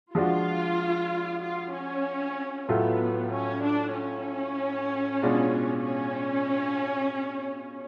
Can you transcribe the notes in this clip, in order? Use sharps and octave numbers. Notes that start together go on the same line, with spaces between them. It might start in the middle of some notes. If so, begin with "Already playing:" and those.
F3 G#3 D4 F4 F#4
F4
C#4
A2 F#3 A3 B3 F4
C#4
D4
C#4
B2 G#3 D4 F4
C#4